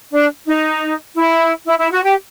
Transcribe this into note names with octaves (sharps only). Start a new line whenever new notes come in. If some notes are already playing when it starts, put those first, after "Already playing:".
D4
D#4
E4
E4
E4
F#4
G4